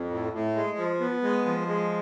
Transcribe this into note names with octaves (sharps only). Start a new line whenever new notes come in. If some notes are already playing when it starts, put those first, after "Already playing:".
Already playing: F2
A2
A2
G#3
F3
B3
G#3
F3
G#3